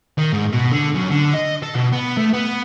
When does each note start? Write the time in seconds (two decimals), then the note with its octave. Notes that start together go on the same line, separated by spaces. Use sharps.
0.18 D#3
0.32 G#2
0.53 B2
0.72 D3
0.95 F#2
1.10 D3
1.35 D#5
1.63 A4
1.75 B2
1.93 B3
2.17 A3
2.33 B3